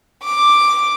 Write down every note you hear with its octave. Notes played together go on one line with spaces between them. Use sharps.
D6